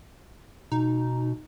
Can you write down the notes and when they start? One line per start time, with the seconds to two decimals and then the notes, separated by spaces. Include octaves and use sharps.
0.72 B2 D#4